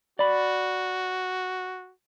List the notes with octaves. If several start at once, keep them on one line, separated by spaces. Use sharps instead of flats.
F#4 D5 B5